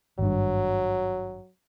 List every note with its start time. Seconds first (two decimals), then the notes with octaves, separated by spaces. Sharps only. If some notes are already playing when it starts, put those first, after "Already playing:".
0.19 G#1 G2 F#3